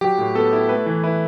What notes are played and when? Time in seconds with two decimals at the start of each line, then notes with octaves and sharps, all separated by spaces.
0.01 F#3 G4
0.18 A2
0.35 B3 A4
0.53 E4
0.69 A3 B4
0.86 E3
1.03 E4 B4